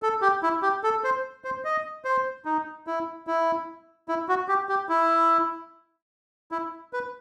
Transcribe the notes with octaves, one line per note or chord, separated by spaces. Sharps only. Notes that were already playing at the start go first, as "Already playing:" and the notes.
A4
G4
E4
G4
A4
C5
C5
D#5
C5
D#4
E4
E4
E4
F#4
G4
G4
E4
E4
B4